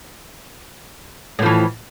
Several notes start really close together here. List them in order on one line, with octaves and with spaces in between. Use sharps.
A2 F3 E3